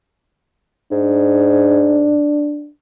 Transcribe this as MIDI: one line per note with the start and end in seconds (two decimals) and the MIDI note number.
0.92 2.18 44
0.92 2.70 62